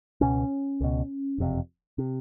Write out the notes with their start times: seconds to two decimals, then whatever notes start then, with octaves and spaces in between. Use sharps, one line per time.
0.21 C#2 B2 C#4
0.81 C#2 B2
1.38 F#1 F2 C3
1.98 C3